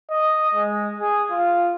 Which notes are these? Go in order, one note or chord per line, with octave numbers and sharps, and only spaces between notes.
D#5
G#3
G#4
F4